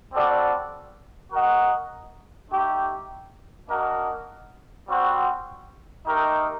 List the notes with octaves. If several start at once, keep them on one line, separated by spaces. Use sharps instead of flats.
G3 C4 F#4 A4 D5
F#4 A#4 D#5 F#5
A3 D#4 G4
A#3 D4 F#4 A#4 D#5
G3 C4 F#4 C5 G5
A3 D#4 G4 A#4 D#5